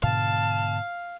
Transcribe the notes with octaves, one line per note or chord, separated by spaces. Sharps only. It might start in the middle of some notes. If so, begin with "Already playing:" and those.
G#2 B2 D3 F5 A5